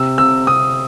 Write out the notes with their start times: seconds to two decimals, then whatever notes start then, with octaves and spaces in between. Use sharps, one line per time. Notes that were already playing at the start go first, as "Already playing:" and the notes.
Already playing: C3 E6
0.18 C3 E6
0.47 C3 D#6